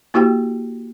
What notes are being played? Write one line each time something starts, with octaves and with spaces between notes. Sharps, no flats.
A#3 E4 F#4 G4 G5